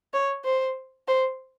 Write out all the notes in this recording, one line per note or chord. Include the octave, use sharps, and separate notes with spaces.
C#5
C5
C5